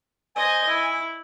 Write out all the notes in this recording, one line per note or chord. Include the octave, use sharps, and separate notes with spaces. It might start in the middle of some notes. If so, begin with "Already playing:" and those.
C5 D#5 G#5
E4